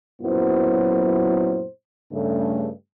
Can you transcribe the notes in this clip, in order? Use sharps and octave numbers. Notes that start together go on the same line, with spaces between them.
F#2 A#2 F#3 B3 E4 C5
G2 C#3 A3